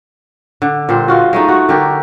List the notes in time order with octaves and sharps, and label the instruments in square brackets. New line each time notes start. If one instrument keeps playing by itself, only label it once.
[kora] D3
A#2 G3 C5
G#3 F4 F#4
G#3 A3 D#4
F#4
D3 D4 G4 A#4